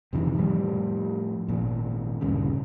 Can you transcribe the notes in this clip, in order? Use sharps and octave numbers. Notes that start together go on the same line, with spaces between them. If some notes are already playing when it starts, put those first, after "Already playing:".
F2 C3 D#3 E3
A2 F3 G3
G#1 A#2
D2 G2 A#2 C#3